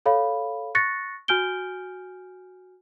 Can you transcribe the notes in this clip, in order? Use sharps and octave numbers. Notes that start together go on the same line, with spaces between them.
A4 C#5 F5 B5
C#6 F#6 A6 A#6 C#7
F#4 G#5 F6 G6 D7 G7